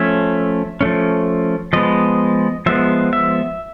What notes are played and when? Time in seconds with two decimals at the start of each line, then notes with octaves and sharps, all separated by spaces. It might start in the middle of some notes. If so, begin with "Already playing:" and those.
Already playing: F3 A3 C#4 E5
0.81 F3 A3 C#4
1.73 F3 G#3 B3 D#5
2.66 F3 G#3 B3 E5
3.13 E5